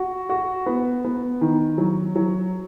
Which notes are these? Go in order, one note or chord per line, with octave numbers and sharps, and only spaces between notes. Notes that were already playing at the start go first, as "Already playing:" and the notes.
Already playing: F#4
F#4
B3
B3
D#3
F#3
F#3